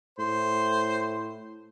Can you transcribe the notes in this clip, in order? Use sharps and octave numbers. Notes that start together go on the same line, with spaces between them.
A2 C5 C6